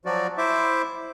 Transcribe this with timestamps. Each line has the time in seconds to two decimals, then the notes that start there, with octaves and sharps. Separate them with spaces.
0.06 F3 F#3 F#4 D5
0.38 E4 C5 E5 D6